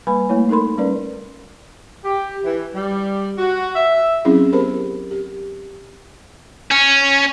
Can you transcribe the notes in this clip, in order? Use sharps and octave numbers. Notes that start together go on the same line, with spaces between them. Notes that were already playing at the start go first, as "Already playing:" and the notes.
G3 A#3 B4 G#5 B5
A3 A#3 E4 C#5
D#4 A4 A#4 B5 C6
G3 C#4 A#4 B4 D5
G4
E3
G3
F#4
E5
F#3 C4 C#4 E4 G#4
B3 G4 A#4 C5 B5
G4
C#4